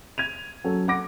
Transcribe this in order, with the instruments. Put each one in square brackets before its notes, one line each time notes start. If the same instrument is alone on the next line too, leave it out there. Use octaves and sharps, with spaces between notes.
[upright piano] G#6 D#7 F7
F#3 C#4 A4
F#5 B5 D6 A#6 D7